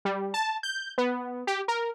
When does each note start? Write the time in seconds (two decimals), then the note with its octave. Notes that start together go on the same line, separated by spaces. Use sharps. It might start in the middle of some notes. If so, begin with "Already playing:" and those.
0.05 G3
0.34 A5
0.63 G6
0.98 B3
1.47 G4
1.68 A#4